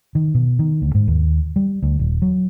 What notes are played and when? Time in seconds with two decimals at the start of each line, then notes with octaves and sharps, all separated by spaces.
0.15 D#3
0.34 B2
0.59 D#3
0.82 D2
0.95 G#2
1.08 D#2
1.56 G3
1.82 D2
1.99 D#1
2.22 F#3